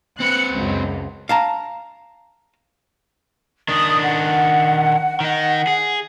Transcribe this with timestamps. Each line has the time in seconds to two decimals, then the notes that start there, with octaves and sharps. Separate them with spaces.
0.20 C4 B4 F#6 C#7
0.52 C#2 F#2
1.29 F5 A5 A#5
3.68 D#3 D4 D#6
4.03 F#5
5.20 D#3 D#4 F#5
5.67 G#4